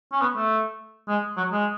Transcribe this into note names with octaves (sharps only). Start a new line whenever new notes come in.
C#4
B3
A3
G#3
F#3
G#3